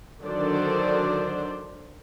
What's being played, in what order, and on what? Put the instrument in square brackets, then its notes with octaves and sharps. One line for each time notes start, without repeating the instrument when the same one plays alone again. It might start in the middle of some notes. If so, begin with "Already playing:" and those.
[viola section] D3 D#3 F#3 D4 C5 D5